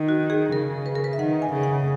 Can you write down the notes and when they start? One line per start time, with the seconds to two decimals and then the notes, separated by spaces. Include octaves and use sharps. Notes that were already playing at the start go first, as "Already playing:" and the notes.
Already playing: D#3
0.09 F#4
0.30 G#4
0.52 C#3 A#4
0.86 B4
0.95 A#4
1.04 B4
1.13 E5
1.19 D#3 F#5
1.42 G#5
1.53 C#3
1.63 F#5